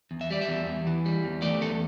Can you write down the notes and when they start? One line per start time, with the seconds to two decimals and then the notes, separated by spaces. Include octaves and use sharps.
0.11 E2
0.21 E5
0.30 G3 D5
0.41 E5
0.49 E2
0.67 E2
0.87 E3
1.05 G3
1.24 E2
1.42 A3 D5
1.61 E2 A4